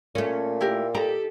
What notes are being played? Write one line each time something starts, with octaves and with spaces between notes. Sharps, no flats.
A#2 A3 C#4
E4 G4 A#4
D#4 G4 A4 A#5